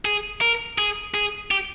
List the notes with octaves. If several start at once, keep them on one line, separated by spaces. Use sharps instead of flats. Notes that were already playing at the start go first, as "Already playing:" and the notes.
G#4
A#4
G#4
G#4
G4